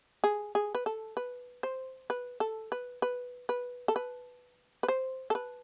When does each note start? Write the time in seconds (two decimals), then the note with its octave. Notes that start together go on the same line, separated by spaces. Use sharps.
0.24 G#4
0.55 G#4
0.75 B4
0.86 A4
1.17 B4
1.63 C5
2.10 B4
2.40 A4
2.72 B4
3.02 B4
3.49 B4
3.88 A4
3.96 B4
4.83 B4
4.88 C5
5.30 A4
5.35 B4